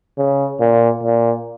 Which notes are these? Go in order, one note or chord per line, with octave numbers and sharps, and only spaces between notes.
C#3
A#2
A#2